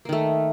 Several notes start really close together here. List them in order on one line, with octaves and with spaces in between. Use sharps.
A#3 D#3 A3